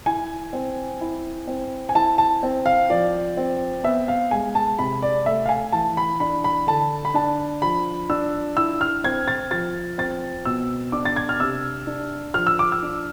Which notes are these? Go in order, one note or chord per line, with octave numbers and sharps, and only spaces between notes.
E4 G#5
C4
E4
C4
G#5
E4 A5
A5
C4
F5
F3 D5
C4
B3 E5
F5
G#3 G#5
A5
C3 B5
D5
A3 E5
F5
G#5
E3 A5
B5
D4 B5
B5
D3 A5
B5
D4 A5
F3 B5
D4 E6
E4 E6
F6
C4 G#6
A6
F3 A6
C4 A6
B2 E6
D4 D6
A6
G#6
F6
C3 E6
D4
F3 F6
E6
D6
E6
D4